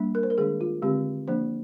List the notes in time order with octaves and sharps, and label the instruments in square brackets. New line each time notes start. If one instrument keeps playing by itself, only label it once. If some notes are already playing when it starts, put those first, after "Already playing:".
Already playing: [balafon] G3 A#3 D4
A#4
C5
A#4
D#3 G#3 D4 G#4
F4
D3 G#3 C4 G4
F3 A#3 D4 C5